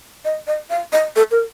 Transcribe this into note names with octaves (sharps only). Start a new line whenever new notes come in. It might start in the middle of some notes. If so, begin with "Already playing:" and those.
D#5
D#5
F5
D#5
A4
A#4